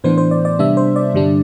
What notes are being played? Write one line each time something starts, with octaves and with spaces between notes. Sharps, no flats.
A2 E3 B3 D4 C5
C5
D5
D5
C3 G3 B3 D4 E5
C5
D5
G2 D3 G3 D4